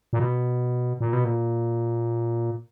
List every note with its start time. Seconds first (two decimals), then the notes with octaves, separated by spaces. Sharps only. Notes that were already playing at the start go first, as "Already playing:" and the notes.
0.13 A#2
0.19 B2
1.00 A#2
1.13 B2
1.24 A#2